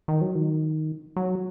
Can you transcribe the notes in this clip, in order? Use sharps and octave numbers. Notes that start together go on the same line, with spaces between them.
D#3
F#3
D#3
F#3